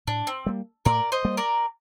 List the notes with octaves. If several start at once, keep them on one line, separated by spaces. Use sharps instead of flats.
A2 D4
C4
G3 A#3
A2 A#4 D5
C5 D#5
G3 A#3
A#4 D5